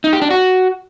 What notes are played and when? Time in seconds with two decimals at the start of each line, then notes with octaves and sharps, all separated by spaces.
0.04 D#4
0.13 G4
0.22 D4
0.31 F#4